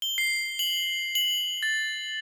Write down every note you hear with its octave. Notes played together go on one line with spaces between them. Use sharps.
G7
C7
F#7
F#7
A6